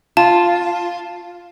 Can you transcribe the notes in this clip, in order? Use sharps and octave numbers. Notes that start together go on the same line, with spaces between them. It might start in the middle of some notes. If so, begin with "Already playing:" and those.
F4 A5